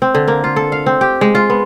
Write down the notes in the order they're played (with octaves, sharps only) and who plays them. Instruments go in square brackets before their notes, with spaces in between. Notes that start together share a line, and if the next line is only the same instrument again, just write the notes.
[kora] C4
D3
A#3
F4
A4
F5
C4
G4
G#3
F4
B3